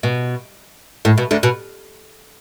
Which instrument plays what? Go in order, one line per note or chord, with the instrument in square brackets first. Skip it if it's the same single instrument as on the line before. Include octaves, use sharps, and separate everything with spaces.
[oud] B2
A2
B2
D2 D3
B2